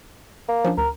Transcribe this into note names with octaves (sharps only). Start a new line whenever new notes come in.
A#3
F3 C#4 D4
D2 A#4